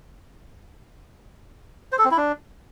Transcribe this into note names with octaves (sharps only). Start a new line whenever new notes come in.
C5
A4
C4
E4
D4